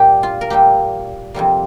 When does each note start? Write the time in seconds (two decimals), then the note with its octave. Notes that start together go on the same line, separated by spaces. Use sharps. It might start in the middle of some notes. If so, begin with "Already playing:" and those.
Already playing: A#2 G3 A#3 G4
0.23 F4
0.41 A#4
0.50 A#2 G3 A#3 G4
1.34 F2 C3 G3 A#3